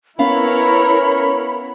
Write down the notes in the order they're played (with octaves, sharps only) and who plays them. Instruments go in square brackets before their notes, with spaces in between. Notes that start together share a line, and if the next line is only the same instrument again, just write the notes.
[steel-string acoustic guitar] B3 F5 [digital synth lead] C#4 [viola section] E4 A#4 C#5 [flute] B5